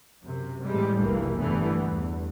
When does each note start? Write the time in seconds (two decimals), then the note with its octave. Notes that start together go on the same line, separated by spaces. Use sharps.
0.23 F#2 C3
0.63 A2 E3 G3 G#3
0.99 F1 B1 G2 E3 A#3
1.39 G1 D3 E3 G3 A3 B3
1.84 G1 E2